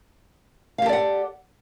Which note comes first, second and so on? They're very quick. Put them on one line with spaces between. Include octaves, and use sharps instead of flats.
F5 G4 A4 D5 F#5